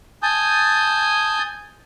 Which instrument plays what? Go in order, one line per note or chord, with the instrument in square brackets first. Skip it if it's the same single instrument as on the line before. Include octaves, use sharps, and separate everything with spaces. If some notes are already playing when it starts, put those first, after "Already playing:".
[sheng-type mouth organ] G#5 D#6 G6 [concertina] A5